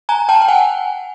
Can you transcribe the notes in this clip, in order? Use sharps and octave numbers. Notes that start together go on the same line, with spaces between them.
G#5 A#5
G5 A5
G5
F#5 G#5